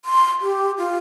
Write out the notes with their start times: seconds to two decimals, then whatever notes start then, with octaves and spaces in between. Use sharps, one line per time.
0.05 C6
0.41 G4
0.78 F4